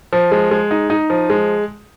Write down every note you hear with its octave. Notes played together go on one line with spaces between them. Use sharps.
F3
G#3
G#3
D#4
D#4
F3
G#3